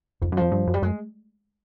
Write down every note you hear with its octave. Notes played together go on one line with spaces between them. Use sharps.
F2 D#3
F#2
F2 F3
G2
F#2
G3
F#2 G#3